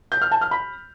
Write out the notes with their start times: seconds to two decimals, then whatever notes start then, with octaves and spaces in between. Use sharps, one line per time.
0.12 G6
0.22 F6
0.32 A5
0.41 F6
0.51 B5